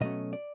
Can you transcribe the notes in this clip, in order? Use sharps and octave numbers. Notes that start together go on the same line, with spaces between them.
B2 F#3 A3 C#4 D#5
D5